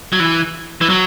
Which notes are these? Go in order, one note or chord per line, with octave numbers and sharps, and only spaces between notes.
F#3
E3
E3
F#3